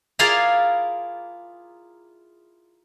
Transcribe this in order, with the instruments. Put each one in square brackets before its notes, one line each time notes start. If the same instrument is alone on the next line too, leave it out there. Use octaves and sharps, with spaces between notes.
[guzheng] E4 F4 G#4 A#4 D5 F5